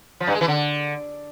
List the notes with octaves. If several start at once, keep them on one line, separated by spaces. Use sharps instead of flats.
F3
G2
G#3
E3
D3